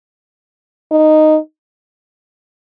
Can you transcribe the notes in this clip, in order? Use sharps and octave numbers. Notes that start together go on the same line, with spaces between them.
D#4